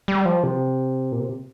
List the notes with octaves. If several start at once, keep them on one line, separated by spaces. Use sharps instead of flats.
G3
F3
C3
A#2
C3